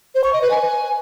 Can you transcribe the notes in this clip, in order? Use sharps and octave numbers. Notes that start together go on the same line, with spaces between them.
C5
C#6
D#5
B4
G#5